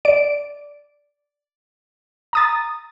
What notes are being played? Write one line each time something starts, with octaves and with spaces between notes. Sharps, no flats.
D5 D7
A#5 D#6 A6